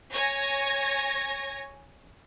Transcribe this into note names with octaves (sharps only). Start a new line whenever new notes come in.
C#5 G#5 G#6 A#6